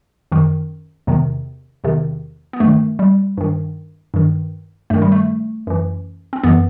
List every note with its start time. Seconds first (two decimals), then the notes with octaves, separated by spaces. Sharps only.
0.32 F#2 D#3
1.07 E2 C3 D#3
1.84 E2 C3 D#3
2.53 B3
2.60 G2 D#3 A3
2.99 G3
3.38 G2 D#3
4.14 G2 D#3
4.90 G2 D#3 A3
5.02 G3
5.12 A3
5.67 F#2 E3
6.33 C4
6.44 F#2 E3 B3